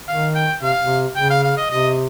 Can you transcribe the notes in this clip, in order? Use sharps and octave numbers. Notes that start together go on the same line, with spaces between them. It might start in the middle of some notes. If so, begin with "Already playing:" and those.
D#3 F5
G5
C3 F5
C3
C#3 G5
F5
F5
D#5
C3 D#5